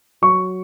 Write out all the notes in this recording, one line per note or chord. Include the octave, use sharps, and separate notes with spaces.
F#3 C#6